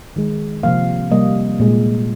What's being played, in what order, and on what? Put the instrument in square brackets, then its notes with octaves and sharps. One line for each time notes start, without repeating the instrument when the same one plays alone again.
[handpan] D#3 G#3
C3 F3 A#3 F5
C3 G3 A#3 D#5
A#2 G#3